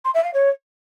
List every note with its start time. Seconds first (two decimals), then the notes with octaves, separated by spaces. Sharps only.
0.04 C6
0.14 E5
0.24 F5
0.33 C#5